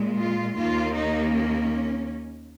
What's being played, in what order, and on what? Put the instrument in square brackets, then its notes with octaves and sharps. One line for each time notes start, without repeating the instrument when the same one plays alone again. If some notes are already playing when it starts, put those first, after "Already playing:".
Already playing: [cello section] A#2 G#3
F4
D#2 D#3 A#3 F4
D#4
C#4